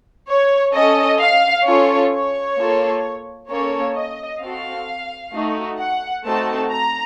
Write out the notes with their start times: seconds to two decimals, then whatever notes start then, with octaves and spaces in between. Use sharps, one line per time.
0.29 C#5
0.74 C#4 A4 D#5
1.21 F5
1.67 C#4 F4 A4 C#5
2.12 C#5
2.58 A#3 F4 A4
3.49 A#3 C#4 A4 C#5
3.96 D#5
4.41 C4 F#4 A4 F5
5.34 A3 D#4 F#4
5.79 F#5
6.25 A3 C4 D#4 F#4 A4 A5
6.71 A#5